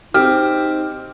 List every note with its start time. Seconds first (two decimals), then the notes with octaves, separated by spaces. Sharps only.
0.14 C4 D#4 G4 F6